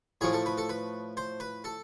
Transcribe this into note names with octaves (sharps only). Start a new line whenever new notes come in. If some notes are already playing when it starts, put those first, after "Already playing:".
A2 F3 A3 G#4
A4
B4
A4
B4
C5
B4
A4